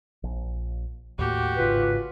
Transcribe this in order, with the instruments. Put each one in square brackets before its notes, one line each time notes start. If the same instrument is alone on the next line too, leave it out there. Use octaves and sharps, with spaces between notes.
[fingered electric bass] A#1
[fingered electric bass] D#2 A2 A#3 [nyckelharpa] F#4 G4
[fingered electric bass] G#1 G#2 C#3 [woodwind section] F4 B4